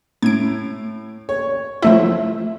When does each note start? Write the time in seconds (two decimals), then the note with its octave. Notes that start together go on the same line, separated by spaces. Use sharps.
0.22 A2 G#6 D7
1.29 C#5
1.82 F3 A3 E4 E5